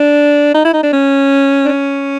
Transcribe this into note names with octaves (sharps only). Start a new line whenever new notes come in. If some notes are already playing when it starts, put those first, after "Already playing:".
Already playing: D4
D#4
E4
D#4
D4
C#4
D4
C#4